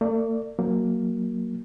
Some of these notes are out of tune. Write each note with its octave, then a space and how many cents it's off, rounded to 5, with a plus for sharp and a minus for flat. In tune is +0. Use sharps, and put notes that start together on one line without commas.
A3 +45 D5 +0
F#3 +0 A#3 +0